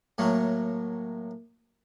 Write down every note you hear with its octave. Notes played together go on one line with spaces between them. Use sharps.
A2 F#3 A#3